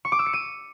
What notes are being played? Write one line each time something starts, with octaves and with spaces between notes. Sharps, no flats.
C#6
D6
E6
C#7
D#7